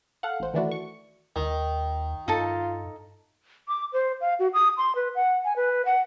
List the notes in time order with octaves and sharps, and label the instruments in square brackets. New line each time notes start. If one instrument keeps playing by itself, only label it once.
[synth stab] A4 F5 F#5
A1 C5
D#3 E3 A3 D4 E4 F#4
C#6
[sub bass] D#2 [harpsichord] D#3
[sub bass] G2 [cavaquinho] D#4 A4 A5 [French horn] F4
[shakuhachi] D6
C5
F5
F#4
D#6
C6
B4
F#5
G#5
B4
F#5